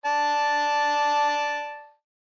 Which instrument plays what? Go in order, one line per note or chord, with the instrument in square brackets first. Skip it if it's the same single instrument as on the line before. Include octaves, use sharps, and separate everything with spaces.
[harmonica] D5 A5